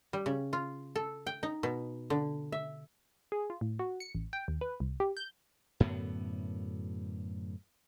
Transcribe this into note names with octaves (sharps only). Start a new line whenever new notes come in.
G3
C#3
F4
A4
G5
D#4
B2
D3
E5
G#4
F4
A2
F#4
C#7
A1
G5
D#2
B4
C2
G4
G6
F#2 A2 D3 B3